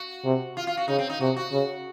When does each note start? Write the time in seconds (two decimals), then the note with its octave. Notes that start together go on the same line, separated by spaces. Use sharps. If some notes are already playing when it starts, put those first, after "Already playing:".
Already playing: F#4
0.25 C3
0.57 F4
0.67 F4
0.77 F#4
0.88 C#3 D#4
0.98 C4
1.10 D#4
1.20 C3 F#4
1.37 F#4
1.52 C#3